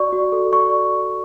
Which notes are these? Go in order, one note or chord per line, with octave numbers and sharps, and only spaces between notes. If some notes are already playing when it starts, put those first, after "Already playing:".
Already playing: F#4 D5 C#6
F#4
A4
D5 C#6